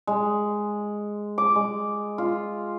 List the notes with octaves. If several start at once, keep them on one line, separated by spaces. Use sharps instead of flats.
G#3
D6
G#3
F4